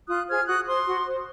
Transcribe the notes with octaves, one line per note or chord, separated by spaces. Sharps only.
F4 D#6 F#6
G#4 C5 F6 G#6
F#4 D#6 F#6
C5 C6 D#6
F#4
C5